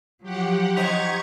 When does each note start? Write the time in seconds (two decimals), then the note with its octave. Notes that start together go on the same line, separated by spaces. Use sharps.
0.23 F3 F#3 G4 F#5
0.76 D#4 C5 D#5 C#6 G6 G#6 B6 F7